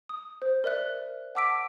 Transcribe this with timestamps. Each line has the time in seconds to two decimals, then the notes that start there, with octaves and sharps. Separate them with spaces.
0.09 D#6
0.42 C5
0.64 A#4 D5 E5 F#6
1.35 F#5 A5 D6 E6 B6 D7